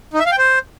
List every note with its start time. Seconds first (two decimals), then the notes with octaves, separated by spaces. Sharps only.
0.13 D#4
0.20 E5
0.26 F5
0.32 G5
0.38 C5